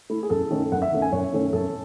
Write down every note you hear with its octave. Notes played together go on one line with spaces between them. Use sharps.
A3 E4
G#4
F#2 A4
D#3 A3 C#4
F#2 F#5
E5
D#3 A3 C#4
G#5
F#2 C#5
D#3 A3 C#4
F#2 A4